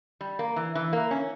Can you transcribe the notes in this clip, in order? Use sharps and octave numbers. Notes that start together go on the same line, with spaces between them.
G3
A#3
E3
E3
A#3
C#4